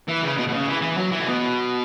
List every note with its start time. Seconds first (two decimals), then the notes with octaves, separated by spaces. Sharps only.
0.08 E3
0.23 C#3
0.38 B2
0.48 B2
0.53 C#3
0.68 E3
0.82 E3
0.97 F#3
1.12 E3
1.20 A2
1.26 B2